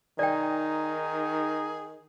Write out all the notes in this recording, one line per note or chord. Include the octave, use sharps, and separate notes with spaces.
D#3 D#4 G#4 D5 G5